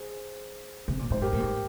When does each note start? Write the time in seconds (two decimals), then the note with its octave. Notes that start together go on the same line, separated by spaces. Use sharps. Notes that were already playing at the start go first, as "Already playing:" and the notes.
Already playing: G#4 C5
0.88 C3
0.99 A#2
1.10 G#2 C5
1.22 G2 G4 A#4
1.33 A#2
1.39 G#2